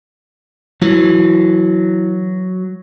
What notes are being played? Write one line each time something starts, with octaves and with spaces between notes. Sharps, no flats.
E3 F#3